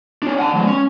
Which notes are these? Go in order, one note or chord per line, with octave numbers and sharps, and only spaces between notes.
D4 C#5
F#5 A5
F3 G#3
C#4